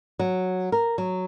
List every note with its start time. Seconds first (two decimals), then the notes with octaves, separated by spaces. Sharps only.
0.19 F#3
0.72 A#4
0.98 F#3